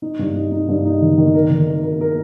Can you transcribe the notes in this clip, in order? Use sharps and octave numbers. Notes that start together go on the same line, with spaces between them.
D#4
G2
D#4
D#4
G2
D#4
D#3
D#3
A#4
D#3
A#4
A#4
A#4